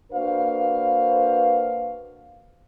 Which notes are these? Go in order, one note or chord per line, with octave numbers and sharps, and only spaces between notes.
A#3 D4 F#4 B4 C5 F5